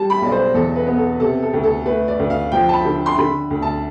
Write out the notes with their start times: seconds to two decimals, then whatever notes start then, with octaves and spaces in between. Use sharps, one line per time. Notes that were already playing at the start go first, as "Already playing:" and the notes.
Already playing: G3 A5
0.10 B5
0.22 B1 D5
0.32 C5
0.54 E2 A4
0.76 B4
0.87 B3
0.98 A4
1.20 C3 A4
1.43 A4
1.53 D2
1.63 A4
1.85 A3 B4
2.08 D5
2.19 D2
2.30 F5
2.52 F3 G5
2.69 A5
2.73 B5
2.85 D3
3.06 C6
3.18 D3 B5
3.50 D2
3.62 A5